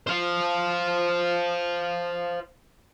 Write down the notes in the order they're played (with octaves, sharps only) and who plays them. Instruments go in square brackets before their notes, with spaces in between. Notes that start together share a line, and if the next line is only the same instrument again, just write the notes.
[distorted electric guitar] C5 F5